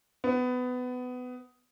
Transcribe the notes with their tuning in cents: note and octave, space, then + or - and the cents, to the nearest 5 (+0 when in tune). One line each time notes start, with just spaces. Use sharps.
B3 +20